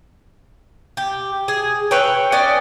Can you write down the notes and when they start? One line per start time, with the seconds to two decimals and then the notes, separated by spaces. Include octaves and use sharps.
0.97 G4
1.48 G#4
1.91 B4 C#5 E5 G5
2.32 C#4 D5 D#5